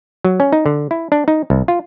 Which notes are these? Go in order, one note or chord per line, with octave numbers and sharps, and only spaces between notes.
F#3
C#4
D#4
D3
E4
D4
D#4
C2
F4